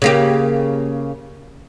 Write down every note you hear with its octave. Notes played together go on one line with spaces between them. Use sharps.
C#3 A#3 G4